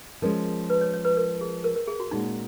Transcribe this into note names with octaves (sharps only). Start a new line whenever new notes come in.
F3 G#3 C#4 A#4
B4
C#5
C#5
B4
A#4
G#4
A#4
A#4
G#4
F#4
A#2 G#3 C#4 D#4 F#4